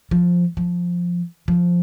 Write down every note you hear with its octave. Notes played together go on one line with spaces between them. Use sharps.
F3
F3
F3